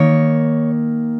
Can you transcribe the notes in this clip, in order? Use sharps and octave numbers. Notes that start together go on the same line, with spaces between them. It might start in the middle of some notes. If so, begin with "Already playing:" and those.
Already playing: D#3 A#3 C#5